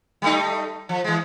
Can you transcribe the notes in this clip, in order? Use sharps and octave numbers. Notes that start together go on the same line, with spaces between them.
G3 A3 D#4
F3
E3 G#3